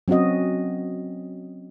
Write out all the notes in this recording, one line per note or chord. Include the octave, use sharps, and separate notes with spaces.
F#3 C4 C#4 F#4 D#5